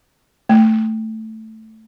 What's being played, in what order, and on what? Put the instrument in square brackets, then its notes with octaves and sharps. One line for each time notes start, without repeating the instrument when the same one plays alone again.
[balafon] A3